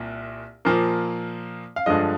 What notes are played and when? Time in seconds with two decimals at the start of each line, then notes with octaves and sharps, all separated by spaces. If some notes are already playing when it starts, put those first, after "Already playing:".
Already playing: C2 A#2
0.65 A#2 F3 A#3
1.76 F5
1.86 G2 D3 F3 G#3 D#5